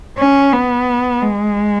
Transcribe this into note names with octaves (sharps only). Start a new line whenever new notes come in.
C#4
B3
G#3